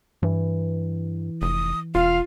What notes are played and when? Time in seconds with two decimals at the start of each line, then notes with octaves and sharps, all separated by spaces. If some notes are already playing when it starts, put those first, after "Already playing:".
0.23 G2 E3
1.42 F1 D#6
1.95 E1 F4 F5